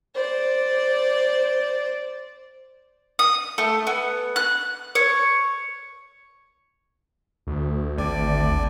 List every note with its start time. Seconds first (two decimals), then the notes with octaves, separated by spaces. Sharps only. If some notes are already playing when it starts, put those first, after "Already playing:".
0.15 C5 D5
3.19 D#6
3.58 A3
3.87 B3
4.36 F#6
4.95 C#5
7.47 D2
7.98 G#1 D5